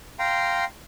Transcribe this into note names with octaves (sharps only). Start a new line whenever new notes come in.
F5 G5 A#5 C6